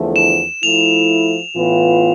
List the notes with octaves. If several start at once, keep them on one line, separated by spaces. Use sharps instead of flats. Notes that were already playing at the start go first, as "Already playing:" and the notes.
Already playing: E2 D3 F3 A3 E4
E7
F3 A3 E4 F7
A2 E3 B3 F4